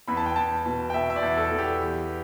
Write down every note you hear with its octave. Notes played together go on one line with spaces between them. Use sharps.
E2 B5
A5
G5
E2 A5
B2
G5
B2 E5
E5
D5
E2
A4
E2
G4
E3